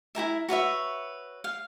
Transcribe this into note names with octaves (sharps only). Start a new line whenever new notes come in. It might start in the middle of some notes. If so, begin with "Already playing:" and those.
E4 G4 A#4 E5
F#4 B4 C#5 E5
F5